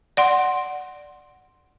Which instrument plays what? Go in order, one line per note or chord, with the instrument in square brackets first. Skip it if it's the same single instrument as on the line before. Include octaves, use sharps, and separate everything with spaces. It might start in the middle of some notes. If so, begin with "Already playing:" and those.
[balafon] D5 F#5 C6